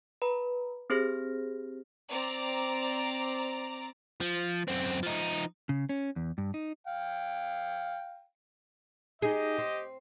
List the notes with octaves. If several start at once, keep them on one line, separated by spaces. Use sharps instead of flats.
B4 A#5 B5
C4 G4 G#4 C5 F6 A#6
C4 D5 A#5
F3
F#2 C4
F3 D#4
C#3
C#4
E2
G2
D#4
F5 G5
D#4 G4 G#4 D#5
C4